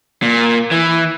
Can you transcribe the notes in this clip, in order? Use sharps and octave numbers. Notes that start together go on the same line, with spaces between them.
A#2
E3